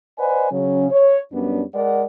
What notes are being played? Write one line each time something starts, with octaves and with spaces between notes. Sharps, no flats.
B4 C5 D5 D#5 F#5 G#5
C#3 F#3 C#4
C#5
F#2 G3 B3 C#4 D4
G#3 A#4 D5 F#5